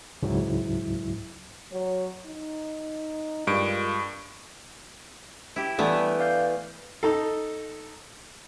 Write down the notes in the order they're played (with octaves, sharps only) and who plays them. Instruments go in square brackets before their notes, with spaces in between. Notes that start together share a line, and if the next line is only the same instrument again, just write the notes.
[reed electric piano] C#2 G#2 F#3 E4
[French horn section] F#3 C#5
D#4
[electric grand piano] G2 D7 [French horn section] G#3 F4 A#4
[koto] E4 G4
[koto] E3 A3 B3 [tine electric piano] G3 D4
[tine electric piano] D5 F5 G6
[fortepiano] D#4 A4